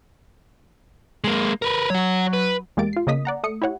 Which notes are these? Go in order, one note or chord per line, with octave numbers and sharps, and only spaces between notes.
G#3 A#3
A#4 B4
F#3 C#5 F#5
B4
E2 G#3 A#3 G4 A6 D7
F4 C7
C#3 A#3 D#5 D#6 B6
D5 F#5 A#5
A3 D#6 C#7
E4 G4 C#5 F#5